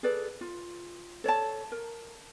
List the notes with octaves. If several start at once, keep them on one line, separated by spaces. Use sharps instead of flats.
G#4 A4 B4 D5
F4
A4 C#5 D5 A5
A#4